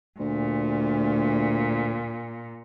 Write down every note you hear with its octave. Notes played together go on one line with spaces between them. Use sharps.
D2 A#2